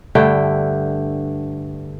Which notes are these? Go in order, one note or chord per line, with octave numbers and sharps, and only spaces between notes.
G2 D3 A3 G5